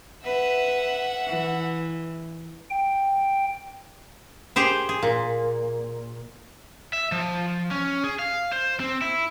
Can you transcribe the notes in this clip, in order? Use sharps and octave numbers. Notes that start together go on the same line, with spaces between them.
B4 E5 F#5
E3
G5
G4 G#4 C5
G#4
A#2
E5
F3
C#4
G#4
F5
C5
C4
E4